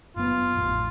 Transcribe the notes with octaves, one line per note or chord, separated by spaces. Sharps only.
F#1 B3 F4
D#1 A1 F2